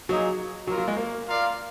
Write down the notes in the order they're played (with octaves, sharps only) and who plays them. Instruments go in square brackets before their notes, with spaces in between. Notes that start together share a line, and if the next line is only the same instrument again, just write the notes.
[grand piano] F#3 [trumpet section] A#3 D#4 G#4 D#5
[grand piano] F#3 [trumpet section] A#3 F4 A#4
[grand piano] F#3
G#3
A#3
[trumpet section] F4 A#4 D5 F5